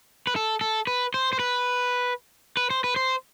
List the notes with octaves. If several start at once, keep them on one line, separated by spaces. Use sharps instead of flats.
B4
A4
A4
B4
C5
C5
B4
B4
C5
B4
C5